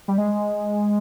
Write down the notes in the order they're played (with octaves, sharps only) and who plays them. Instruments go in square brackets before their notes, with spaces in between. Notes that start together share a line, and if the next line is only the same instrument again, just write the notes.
[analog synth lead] G3
G#3